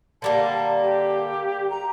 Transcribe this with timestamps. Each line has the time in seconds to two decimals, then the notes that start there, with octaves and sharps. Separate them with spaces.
0.22 D3 G3 A#3 A5
0.83 G4
1.71 A#5